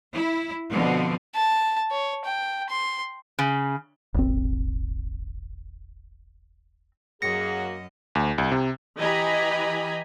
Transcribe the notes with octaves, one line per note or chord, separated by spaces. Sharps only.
E4
B2 D3 F3 C4
A5
C#5
G5
C6
C#3
D#1 G#1 C4
F#2 F#3 A#3 F#4 G#4 D#5 A#6 C#7
D2
C2
C3
E3 G4 D#5 G#5 A#5 B5